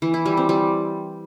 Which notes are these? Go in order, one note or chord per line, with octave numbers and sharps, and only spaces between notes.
E3
E4
G3
C4
G3